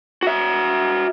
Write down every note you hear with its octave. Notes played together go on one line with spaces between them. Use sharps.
F#4 E5